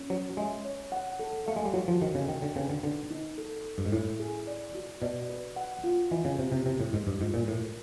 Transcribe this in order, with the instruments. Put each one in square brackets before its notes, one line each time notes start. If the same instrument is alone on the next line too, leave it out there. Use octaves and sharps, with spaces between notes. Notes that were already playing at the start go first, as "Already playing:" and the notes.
Already playing: [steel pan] C#4
[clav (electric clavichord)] F#3 [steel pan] C#5
[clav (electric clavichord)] G#3 [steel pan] E5
[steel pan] C#5
F#5
A4
[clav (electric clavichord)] A3 [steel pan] F5
[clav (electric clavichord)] G#3
G3
[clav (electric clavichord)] F#3 [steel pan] F#4
[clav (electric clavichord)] F3
[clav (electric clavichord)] D#3 [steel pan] F#4
[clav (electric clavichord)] C#3
[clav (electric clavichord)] D#3 [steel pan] G5
[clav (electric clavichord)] D3
[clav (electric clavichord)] C#3 [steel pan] B4
[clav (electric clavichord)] D3
[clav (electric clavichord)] D3 [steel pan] D#4
[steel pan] D#4
A4
A4
[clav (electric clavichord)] G2
G#2
[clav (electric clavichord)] A2 [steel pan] E4
[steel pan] G#4
D5
F#4
[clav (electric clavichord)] B2 [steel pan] D5
[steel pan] B4
F#5
F4
[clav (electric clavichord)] E3 [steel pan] D#5
[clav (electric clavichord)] C#3
[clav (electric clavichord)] C3 [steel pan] C5
[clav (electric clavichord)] C3
[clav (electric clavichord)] C3 [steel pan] E4
[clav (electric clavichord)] A2
[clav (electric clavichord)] G#2 [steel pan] G4
[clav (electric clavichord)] G2
[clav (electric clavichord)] G#2 [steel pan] F4
[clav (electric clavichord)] A#2
[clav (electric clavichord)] A2 [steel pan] A#4